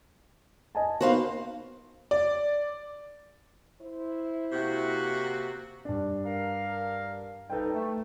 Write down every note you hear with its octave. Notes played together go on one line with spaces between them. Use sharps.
D#5 G#5 A5
A#3 B3 D#4 F#4 C5 F5
D5
E4 C5
C3 A#3 F#4
G2 D4
A#4 F5
F2 G3 D#4 A4 B4 G5
A3